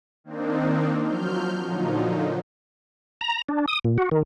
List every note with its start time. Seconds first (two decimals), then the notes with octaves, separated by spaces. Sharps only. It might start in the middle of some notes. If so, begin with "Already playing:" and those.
0.24 D#3 A#3 C4 D4 D#4
1.03 F3 F#3 F6 G6
1.64 A#2 D3 F3 F#3 D#4
3.21 A#5
3.49 D4
3.68 D#6
3.84 A#2
3.98 F#4
4.11 D#3